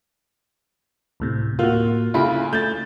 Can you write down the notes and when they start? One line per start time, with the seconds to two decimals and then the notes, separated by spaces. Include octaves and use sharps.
1.20 D2 A2 C3
1.59 A2 A#3 F4 F#4
2.14 D2 C#3 E4 F4 B5
2.53 A3 G6 A6